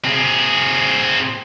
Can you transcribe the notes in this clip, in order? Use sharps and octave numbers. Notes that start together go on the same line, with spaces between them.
C4 G#4